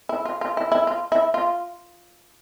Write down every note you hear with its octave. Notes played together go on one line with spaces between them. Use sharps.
E4
F4
F4
E4
E4
F4
E4
F4